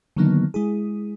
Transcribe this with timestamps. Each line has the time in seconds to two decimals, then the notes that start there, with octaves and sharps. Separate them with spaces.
0.17 D3 D#3 F#3 A#3 B3 D#4
0.54 G#3 E4 G#4